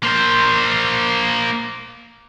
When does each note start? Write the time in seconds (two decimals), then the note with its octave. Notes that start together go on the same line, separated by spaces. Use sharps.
0.03 A#3 C5